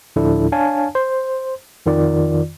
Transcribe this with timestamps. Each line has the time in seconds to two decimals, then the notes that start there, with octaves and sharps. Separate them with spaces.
0.16 D2 A2 F3 D4 E4 A4
0.52 D4 C#5 F5 G#5 A5
0.95 C5
1.86 F2 D#3 F4 D5